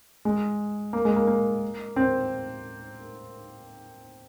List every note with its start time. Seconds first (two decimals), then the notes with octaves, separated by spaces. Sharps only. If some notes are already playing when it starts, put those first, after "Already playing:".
0.25 G#3
0.93 A#3
1.05 G#3
1.16 A#3
1.27 A#3
1.96 C4